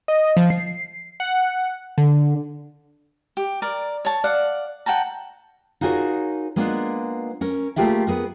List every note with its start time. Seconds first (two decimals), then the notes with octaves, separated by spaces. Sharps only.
0.08 D#5
0.37 F3
0.50 C7
1.20 F#5
1.98 D3
3.37 G4
3.62 A#4 D5
4.05 C#5 A5
4.24 D5 F5 F#5
4.86 F#5 G5 A5 A#5
5.81 D#4 F4 F#4 G#4 A#4 C#5
6.56 G#3 A#3 B3 D4 F4
7.41 C#4 A#4
7.76 A3 A#3 F4 G4 G#4 E5
8.07 B3 G#4 A#4